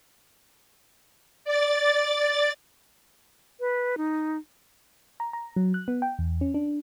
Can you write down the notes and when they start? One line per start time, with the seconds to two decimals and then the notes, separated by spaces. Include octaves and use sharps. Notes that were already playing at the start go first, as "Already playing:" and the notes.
1.45 D5 A6
3.60 B4
3.98 D#4
5.20 A#5
5.33 A#5
5.56 F#3
5.74 F#6
5.88 B3
6.02 G5
6.19 E2
6.41 C#4
6.54 D4